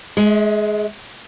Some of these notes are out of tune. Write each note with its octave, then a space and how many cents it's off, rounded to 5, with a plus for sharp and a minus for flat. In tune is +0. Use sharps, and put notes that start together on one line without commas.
G#3 +15 E5 -30